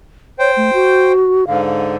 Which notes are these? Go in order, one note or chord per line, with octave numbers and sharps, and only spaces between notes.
C5 C#5 G5
A3
F#4
G#2 D3 F5
F5